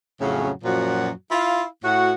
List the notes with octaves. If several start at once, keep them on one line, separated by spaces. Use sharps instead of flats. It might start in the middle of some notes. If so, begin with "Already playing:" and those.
F2 A2 C#3 F#3 C#4
F#2 A#2 F3 F#3 F#4
E4 F4 F5
A2 F#4